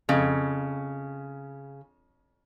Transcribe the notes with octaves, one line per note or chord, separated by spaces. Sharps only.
F2 C#3